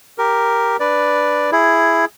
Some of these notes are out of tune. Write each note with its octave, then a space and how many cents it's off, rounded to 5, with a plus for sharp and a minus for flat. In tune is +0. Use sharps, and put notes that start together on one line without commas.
G4 +0 A#4 +0
D4 +0 B4 +0 D5 +0
E4 +10 G#4 +0